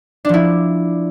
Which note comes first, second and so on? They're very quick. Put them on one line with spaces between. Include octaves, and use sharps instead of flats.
D4 F3 E4